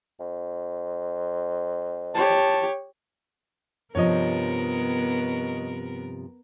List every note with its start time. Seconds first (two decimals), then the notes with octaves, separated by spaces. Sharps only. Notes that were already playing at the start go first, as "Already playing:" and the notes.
0.20 F2
2.15 G4 C#5 A5
3.95 G2 C3 F3 B3 A#4 C#5 D#5